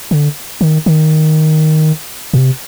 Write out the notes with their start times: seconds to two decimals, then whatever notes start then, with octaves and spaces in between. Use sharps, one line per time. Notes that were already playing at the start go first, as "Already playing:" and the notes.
0.11 D3
0.61 D#3
0.86 D#3
2.34 A#2
2.38 C3